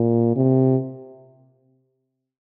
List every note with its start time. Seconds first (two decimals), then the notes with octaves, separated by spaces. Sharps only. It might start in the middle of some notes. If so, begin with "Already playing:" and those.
Already playing: A#2
0.36 C3